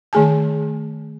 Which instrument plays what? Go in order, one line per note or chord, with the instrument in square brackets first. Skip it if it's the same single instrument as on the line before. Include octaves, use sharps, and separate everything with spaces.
[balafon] D#3 A3 G#4 G#5 A5